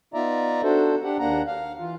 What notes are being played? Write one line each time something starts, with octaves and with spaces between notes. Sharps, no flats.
B3 D#4 F4 D5 E5 A#5
D4 F#4 A4 C5
D4 G4 F#5
D#2 A#3 D4 F#5 A#5
F5
E3 F4